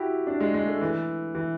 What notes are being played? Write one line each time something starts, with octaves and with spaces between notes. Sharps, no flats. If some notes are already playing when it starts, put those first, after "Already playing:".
Already playing: E4 F#4 G4
D4
G#3
G#3
A3
E3
E3